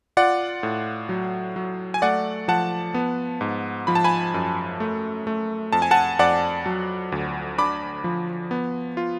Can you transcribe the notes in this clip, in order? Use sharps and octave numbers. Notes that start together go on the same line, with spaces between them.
F4 D5 F#5
A2
F#3
F#3
G#5
A3 D5 F#5
F3 F#5 A5
B3
G#2
F3 B5
A5
G#5 B5
F#2
A3
A3
F2 A5
G#5
F#5 A5
F2 D5 F#5
F#3
D2
D4 B5 D6
F3
B3
F4